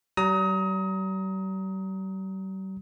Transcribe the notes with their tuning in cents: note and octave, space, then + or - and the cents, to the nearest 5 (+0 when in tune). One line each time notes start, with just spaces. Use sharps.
G3 -45 A#5 +0 D#6 +30